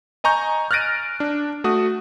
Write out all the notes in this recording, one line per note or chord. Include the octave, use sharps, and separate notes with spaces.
D#5 G#5 A#5 C#6 G6
F6 F#6 A6 A#6 D7 D#7
D4
A3 F#4 D#6